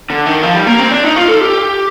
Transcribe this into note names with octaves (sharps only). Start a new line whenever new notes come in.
D3
D#3
F3
G3
A#3
C4
D4
D#4
F4
A4
G4